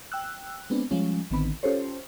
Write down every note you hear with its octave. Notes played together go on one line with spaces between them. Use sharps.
G5 E6 F#6
G#3 B3 C4 D4
F3 G3 G#3 C#4
A1 D3 D#3 B3 C4 B5
C#4 F4 G4 A4 C5 C#5